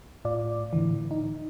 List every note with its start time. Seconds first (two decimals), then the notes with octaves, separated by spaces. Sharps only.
0.25 A2 F4 D5
0.73 A2 D3 E3
1.11 D#4